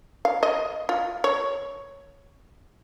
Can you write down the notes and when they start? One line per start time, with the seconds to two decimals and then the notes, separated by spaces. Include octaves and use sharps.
0.25 F5
0.43 D#5
0.89 F4
1.24 C#5